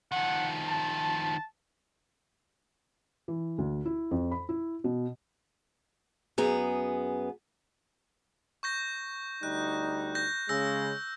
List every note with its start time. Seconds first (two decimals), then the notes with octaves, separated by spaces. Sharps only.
0.12 D#3 F3 F#5
0.68 A5
3.28 E3
3.58 D2
3.85 E4
4.11 F2
4.31 B5
4.49 E4
4.84 B2
6.38 F#2 B3 G#4 A#5
8.63 C#6 G6 A#6
9.43 D2 G3 D#4 F#6
10.15 G6 A#6
10.49 C#3 G#3 E6 A#6